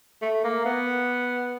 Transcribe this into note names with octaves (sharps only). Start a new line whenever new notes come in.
A3
A#3
B3